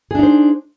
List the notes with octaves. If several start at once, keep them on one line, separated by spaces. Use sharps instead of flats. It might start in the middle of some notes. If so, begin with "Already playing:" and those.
D4 D#4 G#4 C5